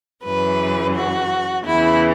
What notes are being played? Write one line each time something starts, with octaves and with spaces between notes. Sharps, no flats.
F#2 C#3 E3 B4
F#4
E2 C#3 E3 E4